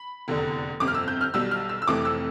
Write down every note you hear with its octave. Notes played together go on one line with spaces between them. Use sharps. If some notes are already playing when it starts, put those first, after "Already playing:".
Already playing: B5
F1 E2 D3
G1 F2 C3 D6
F6
E6
G6
F6
B1 B2 G3 E6
F6
E6
E6
F1 F2 E3 A3 D6
E6